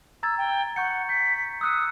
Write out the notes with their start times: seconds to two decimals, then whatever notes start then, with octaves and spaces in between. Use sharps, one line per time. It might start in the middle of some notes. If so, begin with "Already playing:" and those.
0.23 A#5 E6 G#6 A6
0.38 G5
0.76 F#5 C#6 G6 C#7
1.09 G6 B6
1.61 D#6 E6 F#6 C#7